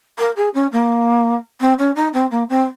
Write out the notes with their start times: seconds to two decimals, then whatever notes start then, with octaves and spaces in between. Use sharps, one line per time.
0.18 A#4
0.36 G#4
0.54 C#4
0.72 A#3
1.60 C4
1.78 C#4
1.95 D#4
2.13 C4
2.31 A#3
2.49 C4